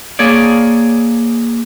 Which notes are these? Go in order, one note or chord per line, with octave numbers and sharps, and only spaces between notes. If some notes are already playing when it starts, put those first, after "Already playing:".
A#3 G#4 C#5 D5